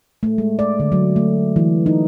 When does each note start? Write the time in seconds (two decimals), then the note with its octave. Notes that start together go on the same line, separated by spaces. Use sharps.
0.23 A3
0.38 G#3
0.59 D5
0.80 D3
0.92 F#3
1.16 A3
1.56 E3
1.86 D#4